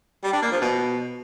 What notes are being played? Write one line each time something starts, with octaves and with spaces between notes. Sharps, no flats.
G3
D4
A#3
F3
B2